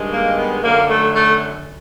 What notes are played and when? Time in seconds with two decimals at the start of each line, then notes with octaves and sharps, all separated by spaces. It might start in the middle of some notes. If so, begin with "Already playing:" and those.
Already playing: G2 D#3 G#3
0.12 A#3
0.37 B3
0.63 F#2 D3 F#3 A#3
0.89 A3
1.14 A3